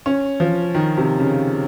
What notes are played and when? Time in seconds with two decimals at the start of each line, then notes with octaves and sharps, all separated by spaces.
0.06 C#4
0.40 F3
0.75 D#3
0.97 C3
1.20 C#3